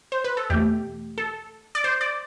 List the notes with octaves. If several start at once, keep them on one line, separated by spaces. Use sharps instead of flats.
C5
B4
A4
E2 B2 A3 G4
A4
D5
C5
D5